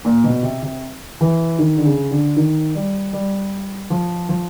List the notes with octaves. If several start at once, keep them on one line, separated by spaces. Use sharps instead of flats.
A#2
B2
C3
C3
E3
D#3
D3
C#3
D3
D#3
G3
G3
F3
F3